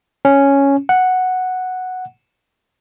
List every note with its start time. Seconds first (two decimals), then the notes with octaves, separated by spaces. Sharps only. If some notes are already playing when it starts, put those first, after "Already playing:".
0.25 C#4
0.89 F#5